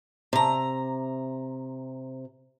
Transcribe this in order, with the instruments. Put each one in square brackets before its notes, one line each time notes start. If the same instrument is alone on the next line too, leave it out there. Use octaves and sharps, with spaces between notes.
[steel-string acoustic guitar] C3 A#5